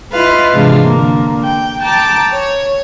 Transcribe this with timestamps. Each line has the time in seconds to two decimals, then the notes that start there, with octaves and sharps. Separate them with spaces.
0.12 E4 F4 B4 D#5 F5
0.53 G#2 C3 E3 G#3 D4 F4
0.84 D3 A#3
1.46 G5
1.82 G5 A5 A#5 D6
2.31 C#5